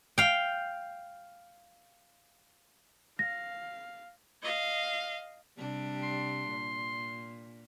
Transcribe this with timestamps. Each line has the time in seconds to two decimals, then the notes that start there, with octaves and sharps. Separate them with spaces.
0.18 F5 G5
3.19 F5 A#6
4.42 D#5 F5
5.58 C3 G3 D4
6.03 C6
6.49 A#2